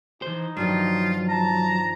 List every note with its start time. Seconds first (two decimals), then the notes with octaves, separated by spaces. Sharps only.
0.22 E3 D#4 C5
0.57 G2 D#3 F3 F#3 F4
1.29 A5 A#5